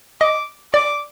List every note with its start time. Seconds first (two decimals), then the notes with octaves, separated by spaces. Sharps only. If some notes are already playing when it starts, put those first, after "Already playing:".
0.21 D#5 D6
0.73 D5 D6